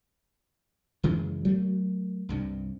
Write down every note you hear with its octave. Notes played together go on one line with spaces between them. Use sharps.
F#2 C#3 E3 G#3
F#3 A3 A#3
C2 G2 C3